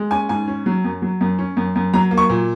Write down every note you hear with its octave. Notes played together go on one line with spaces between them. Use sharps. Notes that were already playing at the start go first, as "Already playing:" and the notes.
Already playing: G#3
C#4 G#5
G#2 G#5
C#4
F#3
F#2
F#3
F#2
C#4
F#2
F#2
F#3 A#5
A#3
C#6
A#2